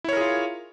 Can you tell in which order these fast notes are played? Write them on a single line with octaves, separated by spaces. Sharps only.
E4 C#5 A#4 G#4 F4